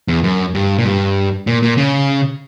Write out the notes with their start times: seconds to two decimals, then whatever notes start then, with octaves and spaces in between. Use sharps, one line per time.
0.08 E2
0.24 F#2
0.55 G2
0.78 A#2
0.85 G2
1.47 A#2
1.62 A#2
1.77 C#3